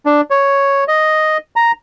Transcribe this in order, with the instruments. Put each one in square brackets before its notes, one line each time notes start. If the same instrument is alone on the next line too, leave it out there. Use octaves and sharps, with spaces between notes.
[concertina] D4
C#5
D#5
A#5